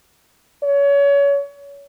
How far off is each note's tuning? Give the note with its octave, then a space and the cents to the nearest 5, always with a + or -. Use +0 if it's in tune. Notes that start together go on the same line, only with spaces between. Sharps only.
C#5 +30